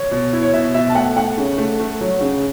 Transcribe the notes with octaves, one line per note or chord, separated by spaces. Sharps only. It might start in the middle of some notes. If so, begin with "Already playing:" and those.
Already playing: C#5
B2
E4
C#5
B2 E5
B2 E5
A5
A3 F#5
A3 F#5
C#3
A3
A3
F#3
C#3